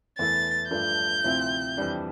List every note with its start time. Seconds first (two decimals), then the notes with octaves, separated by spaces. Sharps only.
0.18 E2 E3 A3 E4 A6
0.71 G2 F3 A3 D4 F4 G6
1.24 D2 C3 F3 C4 E4
1.77 F2 E3 G3 D4